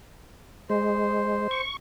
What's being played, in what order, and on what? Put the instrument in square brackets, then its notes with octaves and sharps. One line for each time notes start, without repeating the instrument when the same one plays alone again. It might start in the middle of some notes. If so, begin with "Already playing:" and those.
[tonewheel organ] G#3 [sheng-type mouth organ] C5
[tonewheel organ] C#6